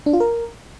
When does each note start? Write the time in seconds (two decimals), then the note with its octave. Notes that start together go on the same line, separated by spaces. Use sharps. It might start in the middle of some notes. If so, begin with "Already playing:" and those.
0.06 D4
0.13 F4
0.20 A#4